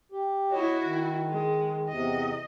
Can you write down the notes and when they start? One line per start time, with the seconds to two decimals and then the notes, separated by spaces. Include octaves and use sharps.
0.12 G4
0.52 E4 F#4 C#5 D#5
0.84 D#3
1.29 G#3
1.90 E2 C3 D#5